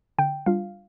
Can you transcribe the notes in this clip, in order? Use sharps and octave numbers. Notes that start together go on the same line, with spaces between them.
D3 G5
G3 D4 F4 F5